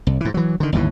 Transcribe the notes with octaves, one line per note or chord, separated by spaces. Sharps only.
C2
G#2 E3
E3 F#3
D3 D#3
G1 D#2 A2 E3